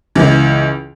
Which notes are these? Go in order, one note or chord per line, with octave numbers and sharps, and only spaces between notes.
C#2 E3